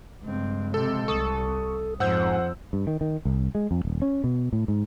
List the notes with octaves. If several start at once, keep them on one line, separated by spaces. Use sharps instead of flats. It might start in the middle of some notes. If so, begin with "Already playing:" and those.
G2 C#3 F3 G#3 C4
C3 C4 A4
C2 A4 C#6 D#6
F2 G#2 C5 F#5 E6 G6
G2
D#3
D#3
C2
G#3
F2
D#1
C#4
B2
A2
G#2